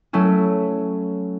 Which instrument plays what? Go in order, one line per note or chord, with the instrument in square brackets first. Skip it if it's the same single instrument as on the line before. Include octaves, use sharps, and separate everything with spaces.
[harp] F#3 A3 C#4 E4